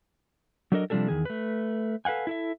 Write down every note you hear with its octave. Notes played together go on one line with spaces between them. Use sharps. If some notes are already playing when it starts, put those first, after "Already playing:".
F#3 A3 D4 A4 A#4 D#5
C3 F3 G3 D4 G#4 A4
E2 D#3 G#4
A3 B4
A4 B4 F5 F#5 G#5
E4 A4 E5